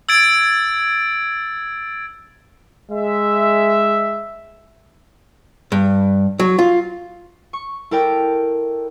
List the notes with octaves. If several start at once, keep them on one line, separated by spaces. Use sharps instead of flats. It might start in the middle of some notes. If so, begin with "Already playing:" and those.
E6 G#6 A6 D7
G#3 E5
G2
F#3
F4
C#6
E4 A4 A#4 D5 G5